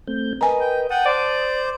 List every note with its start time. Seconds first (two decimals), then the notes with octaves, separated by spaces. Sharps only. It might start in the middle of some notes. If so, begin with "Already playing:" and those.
0.07 A3 C4 G6
0.41 A#4 B4 D#5 G#5 A#5
0.60 G5
0.91 F#5 G5 A5 D#6
1.06 C5 D5